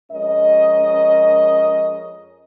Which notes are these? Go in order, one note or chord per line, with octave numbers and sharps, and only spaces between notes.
F2 G#3 C#4 A#4 D#5